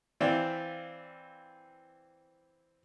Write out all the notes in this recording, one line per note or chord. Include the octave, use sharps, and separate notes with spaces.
E3 C4 D5 E5 F5